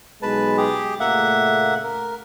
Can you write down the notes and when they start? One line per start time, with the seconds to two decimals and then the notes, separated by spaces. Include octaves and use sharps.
0.22 B1 G#3 B4 A5
0.57 G4 G#4
1.00 A#2 C#3 A3 A#3 E5 F#5
1.83 A#4